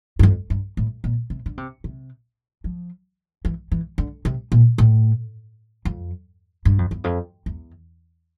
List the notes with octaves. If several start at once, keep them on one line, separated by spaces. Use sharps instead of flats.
G2
F2
G2
A2
A#2
C3
D3
C3
C3
F3
E3
E3
D3
C3
A#2
A2
F2
G2
F2
E2
F2
E2